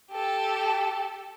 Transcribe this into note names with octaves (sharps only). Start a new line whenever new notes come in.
G4 A4